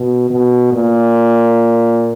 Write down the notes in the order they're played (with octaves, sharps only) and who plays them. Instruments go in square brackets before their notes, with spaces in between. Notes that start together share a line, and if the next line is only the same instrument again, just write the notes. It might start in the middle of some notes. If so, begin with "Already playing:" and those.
Already playing: [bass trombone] B2
B2
A#2